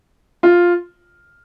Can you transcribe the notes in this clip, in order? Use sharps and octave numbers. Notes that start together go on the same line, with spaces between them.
F4